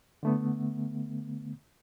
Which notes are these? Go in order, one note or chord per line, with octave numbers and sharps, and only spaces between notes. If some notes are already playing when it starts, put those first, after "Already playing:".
D3 A3 B3